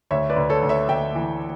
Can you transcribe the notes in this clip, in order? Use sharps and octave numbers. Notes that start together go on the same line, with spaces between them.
D2 C#5 E5
B4 D5
D2
A4 C#5
D2
C#5 E5
D2 E5 G5
E3